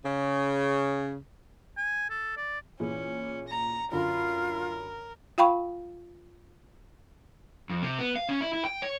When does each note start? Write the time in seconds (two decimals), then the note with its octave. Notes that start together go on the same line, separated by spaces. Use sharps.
0.05 C#3
1.77 G#5
2.10 A4
2.37 D5
2.80 A#2 E3 C#4 G#4
3.48 A#5
3.92 F#2 D3 F4 A#4 B5
5.38 F4 F5 G5 B5 C#6
7.70 F2
7.83 C3
7.99 B3
8.16 F5
8.29 C#4
8.41 E4
8.53 E4
8.65 G5
8.82 C#5